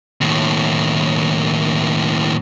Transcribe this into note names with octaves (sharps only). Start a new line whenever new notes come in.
D#2 A2